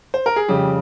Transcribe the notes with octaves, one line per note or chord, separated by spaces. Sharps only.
C5
A#4
G#4
F2 C#3 G3 G4